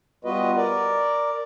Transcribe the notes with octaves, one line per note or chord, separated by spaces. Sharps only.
G3 B3 F4 F#4 B4 D#5
A#4 D5